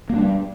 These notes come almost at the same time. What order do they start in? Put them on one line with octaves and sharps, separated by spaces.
A#3 D4 G3